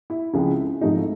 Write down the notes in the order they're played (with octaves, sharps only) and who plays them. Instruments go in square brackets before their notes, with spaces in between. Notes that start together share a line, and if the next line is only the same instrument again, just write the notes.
[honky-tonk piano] E4
C#2 C#3 F3 G#3 C4
G#2 F3 A3 C4 D#4